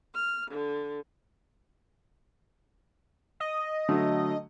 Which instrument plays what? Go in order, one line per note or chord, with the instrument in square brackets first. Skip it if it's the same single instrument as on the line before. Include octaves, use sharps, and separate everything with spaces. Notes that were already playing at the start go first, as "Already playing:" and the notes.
[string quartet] F6
D3
[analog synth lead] D#5
[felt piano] D3 F#3 A3